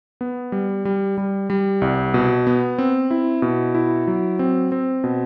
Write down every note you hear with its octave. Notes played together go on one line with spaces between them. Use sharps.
B3
G3
G3
G3
G3
C2
B2
B3
C4
E4
B2
E4
F#3
C4
C4
B2